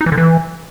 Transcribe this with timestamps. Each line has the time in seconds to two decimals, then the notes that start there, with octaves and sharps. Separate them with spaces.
0.01 D#4
0.06 E3
0.12 D3
0.18 E3